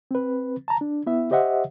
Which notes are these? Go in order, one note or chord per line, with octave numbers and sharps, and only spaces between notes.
C4 B4
A5 A#5
D4
B3 E4 E5
G4 C5 D#5 E5 F#5